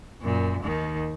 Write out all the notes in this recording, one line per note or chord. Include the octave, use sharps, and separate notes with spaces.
F#2 A#2
D#2 D#3